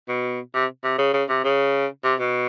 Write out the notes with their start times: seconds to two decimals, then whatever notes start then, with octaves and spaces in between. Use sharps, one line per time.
0.08 B2
0.54 C3
0.84 C3
0.98 C#3
1.13 C#3
1.29 C3
1.44 C#3
2.04 C3
2.19 B2